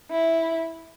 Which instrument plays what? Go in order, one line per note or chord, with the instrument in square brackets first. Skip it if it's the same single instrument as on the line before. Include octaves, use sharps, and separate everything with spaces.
[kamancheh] E4